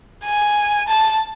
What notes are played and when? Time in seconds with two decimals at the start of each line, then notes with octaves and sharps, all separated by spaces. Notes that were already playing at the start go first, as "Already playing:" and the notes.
0.23 G#5
0.88 A5